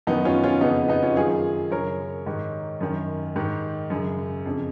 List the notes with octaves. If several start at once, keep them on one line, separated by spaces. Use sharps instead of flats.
F#2 D#3 B3 D#4
C#4 F4
C#4 F4
F2 C#3 B3 D#4
B3 D#4
C#4 F4
F#2 D#3 F4 G#4
F#2 C#3 A#4 C#5
G#2 D#3
F#2 D#3
G#2 D#3
F#2 C#3
F2 C#3